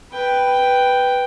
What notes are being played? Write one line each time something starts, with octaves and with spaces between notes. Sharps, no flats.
B4 G5